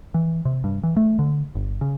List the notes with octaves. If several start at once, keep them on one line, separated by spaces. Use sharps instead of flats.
E3
C3
G2
E3
A3
D3
G1
C#3